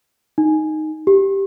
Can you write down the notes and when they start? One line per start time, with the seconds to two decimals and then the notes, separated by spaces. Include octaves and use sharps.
0.38 D#4
1.07 G4